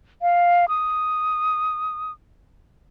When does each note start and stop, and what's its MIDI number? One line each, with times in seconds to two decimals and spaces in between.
0.22 0.66 77
0.69 2.11 87